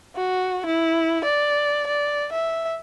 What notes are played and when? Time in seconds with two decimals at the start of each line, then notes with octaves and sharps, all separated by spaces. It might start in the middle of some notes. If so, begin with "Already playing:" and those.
0.16 F#4
0.66 E4
1.24 D5
1.87 D5
2.33 E5